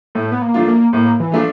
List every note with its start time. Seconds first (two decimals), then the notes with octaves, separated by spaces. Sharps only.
0.15 A2 A3
0.31 B3
0.42 A#3
0.54 F3 A3 D4 F4
0.68 A#3
0.93 A2 A#3
1.20 E3
1.32 F3 A3 D4 F4